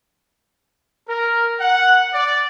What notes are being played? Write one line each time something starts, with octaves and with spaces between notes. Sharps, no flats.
A#4
F#5
D5